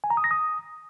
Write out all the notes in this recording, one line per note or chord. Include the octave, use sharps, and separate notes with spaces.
G#5
A#5
D#6
A#6
D#6